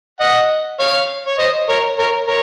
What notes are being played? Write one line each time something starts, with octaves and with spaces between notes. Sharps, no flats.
D#5 F#5
C#5 F5
C#5
C5 D#5
A#4 C#5
A#4 C#5
A#4 C#5